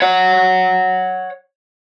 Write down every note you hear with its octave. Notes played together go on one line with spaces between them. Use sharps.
C#5 F#5